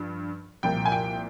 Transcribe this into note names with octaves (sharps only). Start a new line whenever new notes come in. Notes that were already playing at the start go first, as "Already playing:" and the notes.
Already playing: G2 F3
C2 A#2 F3 G5
G#5
G5